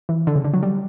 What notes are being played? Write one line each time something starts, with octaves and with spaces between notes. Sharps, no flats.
E3
D3
C#3
D3
F#3
G3